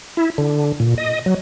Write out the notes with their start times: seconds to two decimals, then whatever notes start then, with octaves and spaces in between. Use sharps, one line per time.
0.17 E4
0.38 D3
0.80 A#2
0.98 D#5
1.26 F#3